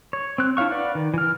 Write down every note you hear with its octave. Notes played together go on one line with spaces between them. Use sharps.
C#5
C4 F#6
D4 E4 C#5 F5 C#6
B4 D5 F5 F#5
D#3
E3 F6